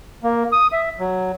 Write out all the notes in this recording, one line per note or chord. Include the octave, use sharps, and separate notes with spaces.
A#3
D#6
E5
F#3